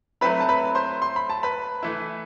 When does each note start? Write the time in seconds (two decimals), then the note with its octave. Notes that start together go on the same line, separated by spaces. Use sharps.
0.21 F#3 A3 C4 E4 B4 B5
0.40 A5
0.49 B4 B5
0.75 C5 C6
1.02 C6
1.16 B5
1.30 A5
1.43 B4 B5
1.83 E3 A3 E4